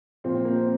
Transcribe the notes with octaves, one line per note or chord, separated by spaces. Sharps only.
A#2 F3 C4
C4
A#3
C4